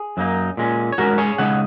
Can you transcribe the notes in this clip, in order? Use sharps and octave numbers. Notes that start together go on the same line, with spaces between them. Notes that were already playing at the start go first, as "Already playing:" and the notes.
Already playing: G#4
F#2 F#3 A#3 D#4
A#2 G#3 C#4
C#5
G#2 G#3 C#4 F#4 A#4
G#4 C#5
C#3 G#3 D#4 C#5 F#5